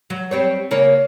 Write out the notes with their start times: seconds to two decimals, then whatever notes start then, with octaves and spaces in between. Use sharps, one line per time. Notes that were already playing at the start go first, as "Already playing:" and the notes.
0.10 F#3
0.31 G3 C4 C#5
0.71 C#3 A#3 C#5